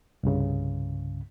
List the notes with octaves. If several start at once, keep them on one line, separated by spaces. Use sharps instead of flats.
C2 G2 C#3